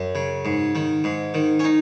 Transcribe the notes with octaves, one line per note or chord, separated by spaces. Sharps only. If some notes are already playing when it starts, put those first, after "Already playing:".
Already playing: F#2
C#3
G#2
D#3
G#2
D#3
C#4
D#4